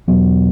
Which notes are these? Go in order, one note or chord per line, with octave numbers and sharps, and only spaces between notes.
E1 E2 B2 F#3 B3